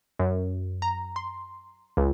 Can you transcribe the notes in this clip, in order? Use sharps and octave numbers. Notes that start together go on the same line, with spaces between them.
F#2
A#5
C6
C#2